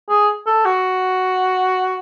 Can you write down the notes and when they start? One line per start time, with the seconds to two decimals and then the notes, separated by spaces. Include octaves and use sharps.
0.09 G#4
0.46 A4
0.65 F#4